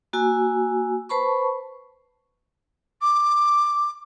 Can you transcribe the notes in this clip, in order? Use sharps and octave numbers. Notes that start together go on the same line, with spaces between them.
A#3 F#4 G#5 E6
B4 C5 A5 B5 C#6
D6